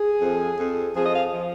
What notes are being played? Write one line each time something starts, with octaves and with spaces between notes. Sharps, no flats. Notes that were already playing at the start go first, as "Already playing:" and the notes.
Already playing: G#4
F2 F3
F2 F3
F2 F3 G#4
D#5
F5
F3